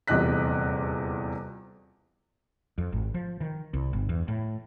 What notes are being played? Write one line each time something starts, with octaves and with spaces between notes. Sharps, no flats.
D#1 E2 C3 D#5 F#6 B6
F2
G#1
F3
D#3
C2
G1
E2
A2